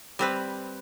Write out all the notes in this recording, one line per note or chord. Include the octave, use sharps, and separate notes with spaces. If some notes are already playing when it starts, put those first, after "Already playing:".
G3 C4 B4